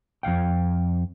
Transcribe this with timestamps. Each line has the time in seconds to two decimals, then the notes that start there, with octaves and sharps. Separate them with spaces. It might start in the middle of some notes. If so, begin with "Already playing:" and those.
0.23 F2 G#2 F5 G5